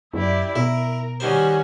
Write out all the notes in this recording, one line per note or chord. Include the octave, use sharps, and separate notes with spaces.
F#2 E4 G4 D5
B2 E4 A#4
D#3 G3 C#4 F#4 C5 G#5